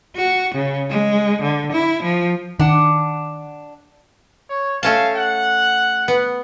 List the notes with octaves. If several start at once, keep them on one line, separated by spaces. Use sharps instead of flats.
F#4
C#3
G#3
D3
E4
F3
D#3 D4 F#5
C#5
A3 C#4 F5 A5
F#5
B3